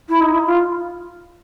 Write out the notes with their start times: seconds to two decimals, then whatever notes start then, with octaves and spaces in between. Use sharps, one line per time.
0.09 E4
0.21 D#4
0.33 E4
0.46 F4